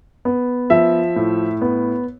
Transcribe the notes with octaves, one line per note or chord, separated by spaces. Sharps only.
B3
F3 E5
A2
B3